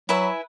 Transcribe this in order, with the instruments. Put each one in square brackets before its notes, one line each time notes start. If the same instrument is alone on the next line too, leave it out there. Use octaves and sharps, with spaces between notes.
[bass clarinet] F#3 [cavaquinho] E4 B4 E5 G#5